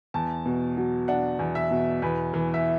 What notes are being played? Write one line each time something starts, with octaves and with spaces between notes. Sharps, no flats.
E2 A5
B2
F#3
D4 F#5
E2
E5
B2
E2 B4
E3
E5